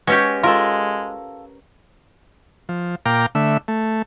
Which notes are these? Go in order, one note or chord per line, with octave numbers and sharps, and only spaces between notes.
G#3 C#4 G4 B4 F#5 C#6
G#3 F4 A4 A#4
F3
A#2 F5 G5 A#5 D6
D3 A3 E5
A3